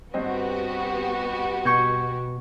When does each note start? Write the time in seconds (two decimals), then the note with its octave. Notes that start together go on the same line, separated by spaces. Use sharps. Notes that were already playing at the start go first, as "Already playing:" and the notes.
0.14 G2 B3 C4 F#4 G4 D#5
1.65 B2 C#6 G6 G#6